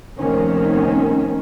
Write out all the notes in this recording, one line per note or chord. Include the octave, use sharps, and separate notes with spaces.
F1 D#2 D#3 A#3 C4 C#4